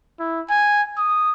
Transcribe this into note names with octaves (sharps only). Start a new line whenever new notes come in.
E4
G#5
D#6